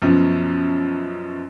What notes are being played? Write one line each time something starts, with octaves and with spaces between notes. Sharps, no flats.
F#2 B2 F3